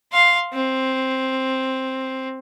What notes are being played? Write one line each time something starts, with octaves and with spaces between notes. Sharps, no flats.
F5 C6
C4